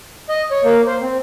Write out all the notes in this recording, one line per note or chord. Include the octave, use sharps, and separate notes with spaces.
D#5
C#5
A#3
C5
C4